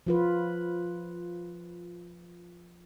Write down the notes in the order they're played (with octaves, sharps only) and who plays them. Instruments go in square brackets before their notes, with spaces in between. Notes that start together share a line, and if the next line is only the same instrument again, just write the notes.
[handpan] F3 F4 B4